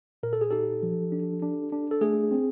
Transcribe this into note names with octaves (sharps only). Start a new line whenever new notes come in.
A#2 A#4
A4
G#4
D#4 G4 A4
F3
D4
D4
D4
A4
A3 G#4
C4